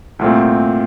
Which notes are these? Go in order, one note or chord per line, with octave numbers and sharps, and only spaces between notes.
C2 A#2 A3 C4